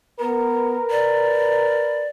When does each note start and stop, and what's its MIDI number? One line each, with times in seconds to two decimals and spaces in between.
0.20 0.77 59
0.20 2.04 70
0.20 2.04 71
0.91 2.08 74